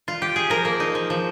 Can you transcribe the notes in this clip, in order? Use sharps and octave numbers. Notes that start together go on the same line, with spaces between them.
F4
G4
G#4
F3 A#4
A#3
D#4
F3
F3